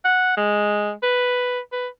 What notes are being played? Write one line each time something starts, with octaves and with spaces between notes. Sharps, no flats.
F#5
G#3
B4
B4